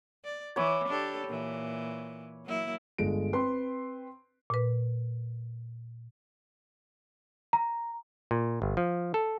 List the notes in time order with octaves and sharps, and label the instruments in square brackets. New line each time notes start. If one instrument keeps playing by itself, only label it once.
[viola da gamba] D5
[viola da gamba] E3 [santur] C#5 B5 D6
[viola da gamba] D4 G4 A4
A#2 E3
F#3 A#3 E4
[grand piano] G1 G#3 A4 D7
C4 B4 C6
[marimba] A#2 B4
[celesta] A#5
[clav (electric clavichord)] A#2
G1
F3
A4